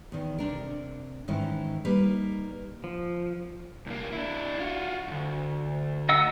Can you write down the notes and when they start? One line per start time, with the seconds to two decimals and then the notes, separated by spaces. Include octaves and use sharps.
0.12 E2 D#3
0.38 C3 D4 A#4
1.28 G#2 D#3 E3 C#4 D#4 E4
1.85 G3 A#3 D#4 B4
2.84 F3
3.86 C2 A#3
4.12 D4 E4
4.59 F4 F#4
5.08 D2 G#2
6.09 D#4 F#5 E6